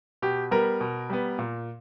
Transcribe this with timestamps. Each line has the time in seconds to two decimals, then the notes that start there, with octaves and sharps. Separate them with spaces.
0.22 B2 G4
0.51 G3 B3 A#4
0.81 B2
1.10 G3 B3
1.39 A#2